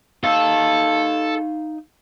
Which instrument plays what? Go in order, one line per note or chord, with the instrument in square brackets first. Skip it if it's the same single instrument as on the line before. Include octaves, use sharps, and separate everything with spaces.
[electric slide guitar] D#4 D#5 F5 [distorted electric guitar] A4